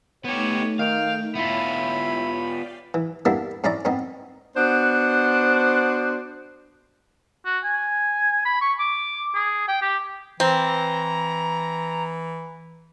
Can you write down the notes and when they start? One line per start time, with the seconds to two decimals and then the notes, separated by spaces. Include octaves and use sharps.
0.25 A3 B3 D#4 G4 C#5
0.79 D#3 F5 G5
1.35 B3 E4 F4 C#5 G5 B5
2.31 D5 F5 G5
2.94 E3
3.25 G3 A#3 B3 D4 E4
3.64 G#2 C#4 E4 D5 A#5
3.85 G#2 B3 C4 D#4
4.57 B3 D4 F#4 C5
7.45 F#4
7.64 G#5
8.45 B5
8.61 C#6
8.79 D6
9.35 G#4
9.68 G5
9.82 G4
10.40 E3 C4 A#5